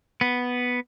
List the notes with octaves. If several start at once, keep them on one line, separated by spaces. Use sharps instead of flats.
B3